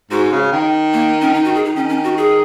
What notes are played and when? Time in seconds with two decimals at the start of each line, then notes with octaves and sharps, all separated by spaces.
0.11 G#2 F#4
0.31 C#3
0.52 D#3
0.93 A#3
1.21 C#4
1.34 D#3 D#4
1.45 F#4
1.55 G#4
1.65 D#4
1.76 D#3 C#4
1.89 C#4
2.04 F#4
2.18 G#4